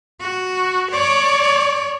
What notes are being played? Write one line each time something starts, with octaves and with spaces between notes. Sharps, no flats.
F#4
C#5 D5